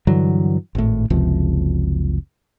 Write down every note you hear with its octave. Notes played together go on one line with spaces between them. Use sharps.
G2 D3 E3 F#3
G#1 A2
F#1 C#2 C3 F3